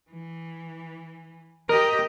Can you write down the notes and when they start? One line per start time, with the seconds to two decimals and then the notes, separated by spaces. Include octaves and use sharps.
0.11 E3
1.69 G4 A#4 D#5